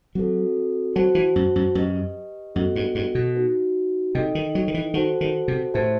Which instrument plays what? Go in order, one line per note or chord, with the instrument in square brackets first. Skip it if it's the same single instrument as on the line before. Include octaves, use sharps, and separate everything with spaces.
[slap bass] F#3 [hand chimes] C4 F#4 A4
[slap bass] F#3 [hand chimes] F#4 C5 F#5 A5
[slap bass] E3
F#2
F#2
[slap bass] F#2 [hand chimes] G4 B4 D#5
[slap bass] F#2 [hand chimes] B3 F#4 A4 D#5 F#5
[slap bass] G2
G2
B2
[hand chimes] D#4 F#4 B4
[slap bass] C3 [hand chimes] D#4 A4 D#5 G5
[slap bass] D#3
F#3
D#3
E3
[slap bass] D#3 [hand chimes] F#4 A4 C5 F#5 A5
[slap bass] D#3
C3
[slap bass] A2 [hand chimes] G4 C5 E5 A5